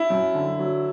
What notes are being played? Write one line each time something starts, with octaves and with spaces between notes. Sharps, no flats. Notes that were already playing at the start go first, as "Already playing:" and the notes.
Already playing: E4
F#2
D3
F#3